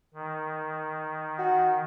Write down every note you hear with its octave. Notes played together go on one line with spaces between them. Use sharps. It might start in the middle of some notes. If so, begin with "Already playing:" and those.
D#3
F#4